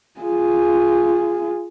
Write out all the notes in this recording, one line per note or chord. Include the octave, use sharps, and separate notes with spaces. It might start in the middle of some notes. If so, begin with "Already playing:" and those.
F4 G#4